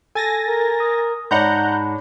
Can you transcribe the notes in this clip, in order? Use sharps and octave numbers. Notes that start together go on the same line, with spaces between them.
A4 G#5 A6 A#6
A#4
D#6
G#2 D4 C#5 D5 F#5 A#5 B5 G6